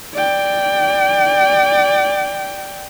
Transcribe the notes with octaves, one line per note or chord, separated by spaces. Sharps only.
D5 G5